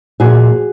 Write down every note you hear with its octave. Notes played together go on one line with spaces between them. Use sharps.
A#2 F3 F#4 G#4